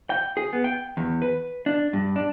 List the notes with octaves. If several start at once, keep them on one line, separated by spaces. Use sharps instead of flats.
G5
G#4
B3
G5
E2
B4
D4
G2
D4